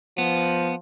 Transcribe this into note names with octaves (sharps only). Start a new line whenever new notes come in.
F3 B3